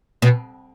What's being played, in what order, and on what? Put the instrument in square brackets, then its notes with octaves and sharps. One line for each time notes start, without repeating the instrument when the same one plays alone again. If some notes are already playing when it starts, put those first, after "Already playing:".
[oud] B2